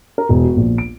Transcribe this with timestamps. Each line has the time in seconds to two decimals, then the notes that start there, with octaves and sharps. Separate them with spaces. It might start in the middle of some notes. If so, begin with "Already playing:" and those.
0.18 A#4
0.29 E1
0.45 F#4
0.56 A#1
0.78 D7